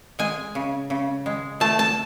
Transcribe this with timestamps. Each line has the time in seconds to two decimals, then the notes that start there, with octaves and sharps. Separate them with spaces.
0.19 G#3 G#5
0.55 C#3
0.90 C#3
1.26 G#3
1.60 A3 A5
1.79 A5